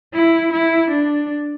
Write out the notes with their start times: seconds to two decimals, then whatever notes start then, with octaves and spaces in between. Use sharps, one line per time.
0.14 E4
0.53 E4
0.90 D4